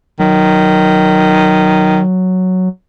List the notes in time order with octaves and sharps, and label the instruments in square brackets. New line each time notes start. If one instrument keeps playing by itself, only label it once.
[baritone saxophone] D#3 [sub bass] F#3